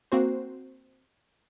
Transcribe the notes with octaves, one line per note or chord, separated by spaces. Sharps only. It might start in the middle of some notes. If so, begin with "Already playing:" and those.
A#3 C4 F#4 C5